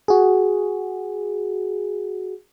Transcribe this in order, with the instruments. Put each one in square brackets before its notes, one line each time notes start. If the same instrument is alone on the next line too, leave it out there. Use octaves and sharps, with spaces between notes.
[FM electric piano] F#4 G#4